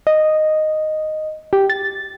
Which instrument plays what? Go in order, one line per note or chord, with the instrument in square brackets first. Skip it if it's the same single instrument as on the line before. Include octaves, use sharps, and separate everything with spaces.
[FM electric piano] D#5
G4
A6